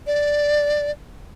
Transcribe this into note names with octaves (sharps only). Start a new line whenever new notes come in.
D5